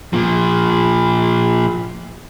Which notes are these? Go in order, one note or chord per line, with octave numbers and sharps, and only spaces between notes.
A#2 F3